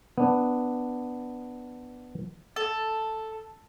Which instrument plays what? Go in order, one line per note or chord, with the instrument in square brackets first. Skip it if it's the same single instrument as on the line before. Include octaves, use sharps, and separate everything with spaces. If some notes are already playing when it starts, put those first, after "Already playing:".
[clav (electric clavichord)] B3 D4
[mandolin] A4